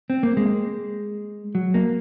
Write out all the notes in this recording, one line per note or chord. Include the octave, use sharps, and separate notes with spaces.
C4
A#3
G#3
F#3
A#3